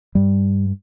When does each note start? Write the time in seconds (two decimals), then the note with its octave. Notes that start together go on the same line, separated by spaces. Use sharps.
0.15 G2 G3